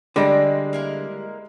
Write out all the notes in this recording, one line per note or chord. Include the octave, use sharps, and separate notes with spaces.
D3 G3 G#3 G#4 D5 A#6
A#3 E4 A#4